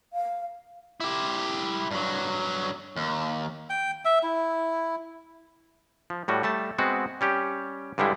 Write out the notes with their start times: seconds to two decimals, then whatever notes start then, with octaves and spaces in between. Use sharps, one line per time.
0.13 F5
1.00 E4 G4
1.91 G2 F#3
2.96 D#2
3.70 G5
4.05 E5
4.23 E4
6.10 F3
6.28 A2 G3 F#4
6.43 G3 A3 A5
6.78 G#3 B3 C4 F#4
7.21 G3 C#4 G4
7.98 G2 D3 G3 G#3 E4